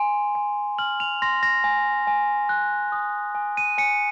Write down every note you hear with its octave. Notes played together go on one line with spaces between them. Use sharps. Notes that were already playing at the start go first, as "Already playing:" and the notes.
Already playing: G#5 C6
G#5
F6 F#7
F7
C6 A#6
A#6
G#5
G#5
F#6
D#6
G#5
D#7
G#5 C#7